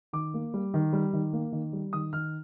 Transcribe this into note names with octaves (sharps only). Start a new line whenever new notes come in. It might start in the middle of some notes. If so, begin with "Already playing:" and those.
D#3 D6
A#3
G3
D#3
G3
D#3
A#3
D#3
G3
D#3 D#6
D#3 F6